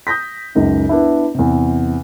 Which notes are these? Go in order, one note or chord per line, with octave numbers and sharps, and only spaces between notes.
D#6 G6 A#6 B6
C#2 F#2 D#4
B3 D4 E4
E2 C3